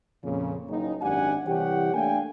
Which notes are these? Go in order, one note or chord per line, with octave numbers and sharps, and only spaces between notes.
F2 A#2 C#3
F#1 D#4
G#1 F#2 D4 G4 F#5 G#5
C2 E3 G4 C#5 F#5 G5
A3 A#3 D4 F5 G5 G#5